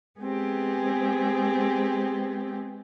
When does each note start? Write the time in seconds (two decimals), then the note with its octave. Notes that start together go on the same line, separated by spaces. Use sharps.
0.19 G#3 B3 C4 G4 G#4